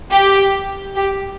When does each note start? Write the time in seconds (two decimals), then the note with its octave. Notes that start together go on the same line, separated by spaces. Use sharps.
0.12 G4
0.96 G4